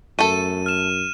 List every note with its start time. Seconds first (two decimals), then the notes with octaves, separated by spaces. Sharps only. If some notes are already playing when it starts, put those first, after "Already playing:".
0.19 F#2 A3 A4 D#7
0.66 F6 E7